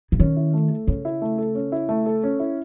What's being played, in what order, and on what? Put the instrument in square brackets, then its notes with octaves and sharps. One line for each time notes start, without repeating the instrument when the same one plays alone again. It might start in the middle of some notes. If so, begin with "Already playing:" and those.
[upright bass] C#3
[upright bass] D#3 [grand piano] C#4
[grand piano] E4
A3
A4
[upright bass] C#3 [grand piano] C#4
[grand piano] E4
A3
A4
C#4
E4
A3
A4
C#4
E4